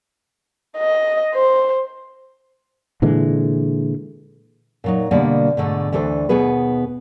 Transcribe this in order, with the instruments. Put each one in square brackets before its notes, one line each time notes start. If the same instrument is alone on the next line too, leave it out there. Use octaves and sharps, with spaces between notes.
[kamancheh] D#5
C5
[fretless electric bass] A#2 D3 E3 G#3
[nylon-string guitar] A#2 F#3 D#4
B2 D3 G3 A#3 B3
G#2 B2 D3 A3 D4
D2 E3 D4 A4 C5
D#2 B2 B3 G#4 B4